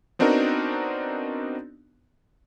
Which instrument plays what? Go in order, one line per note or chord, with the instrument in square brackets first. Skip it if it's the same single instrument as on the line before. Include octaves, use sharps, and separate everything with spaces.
[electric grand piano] B3 C4 D4 D#4 F#4 A#4